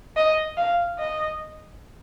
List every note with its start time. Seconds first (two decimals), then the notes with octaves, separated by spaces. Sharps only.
0.17 D#5
0.58 F5
0.99 D#5